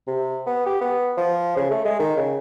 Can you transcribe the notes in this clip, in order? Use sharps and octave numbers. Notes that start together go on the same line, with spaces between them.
C3
B3
G4
B3
F3
C#3
A3
G#3
D#3
C#3